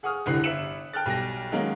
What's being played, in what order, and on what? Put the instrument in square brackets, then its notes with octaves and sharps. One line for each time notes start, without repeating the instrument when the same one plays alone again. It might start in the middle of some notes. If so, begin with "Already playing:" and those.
[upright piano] G#4 F#5 C#6 D#6 F6
F1 C2 D3 E3 F#6 C7
G1 E5 C#7 E7 F#7
G5 A5 F6 F#6 A6
B1 G3 G5 A#6
D#3 F#3 G#3 A#3 C#4 D#4